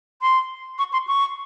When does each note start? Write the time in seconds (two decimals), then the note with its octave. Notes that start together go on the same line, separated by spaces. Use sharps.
0.22 C6
0.79 C#6
0.93 C6
1.07 C#6